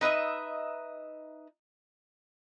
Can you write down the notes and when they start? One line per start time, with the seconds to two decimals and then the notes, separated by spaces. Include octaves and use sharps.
0.01 D#4 B4 D#5 E5